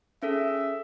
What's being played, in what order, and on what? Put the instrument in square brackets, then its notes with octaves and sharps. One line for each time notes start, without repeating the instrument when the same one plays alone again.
[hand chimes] C#4 G#4 A4 [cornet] E5